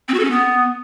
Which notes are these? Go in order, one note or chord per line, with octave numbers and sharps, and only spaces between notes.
C4
F#4
A4
C#4
B3